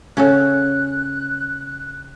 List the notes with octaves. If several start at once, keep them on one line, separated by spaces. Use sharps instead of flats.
C#3 C#4 F#4 A4 F#6